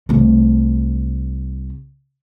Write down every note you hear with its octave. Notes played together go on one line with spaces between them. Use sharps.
C2 A3